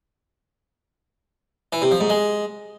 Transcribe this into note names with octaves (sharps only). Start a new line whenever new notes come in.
E3
C3
F3
G#2
G#3